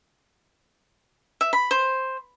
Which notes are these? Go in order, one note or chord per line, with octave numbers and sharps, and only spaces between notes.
E5
B5
C5